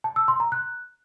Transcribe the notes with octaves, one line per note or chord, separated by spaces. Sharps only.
A5
E6
C6
A#5
F#6